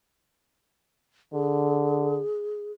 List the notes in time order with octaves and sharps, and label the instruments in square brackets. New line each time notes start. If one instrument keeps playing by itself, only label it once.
[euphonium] D3 [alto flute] G#4